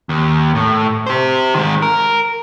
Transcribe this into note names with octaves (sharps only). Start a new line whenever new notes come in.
D#2
A2
G4 C5
D#3 G#3
A#4